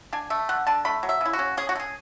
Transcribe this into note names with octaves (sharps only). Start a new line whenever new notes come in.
D4 G#5
A3 E5
D3 F#5
D3 A5
A3 B5
F#3
E5
C#3 E4
F#4
C#4
C#4 G#4
F#4
A3
G#4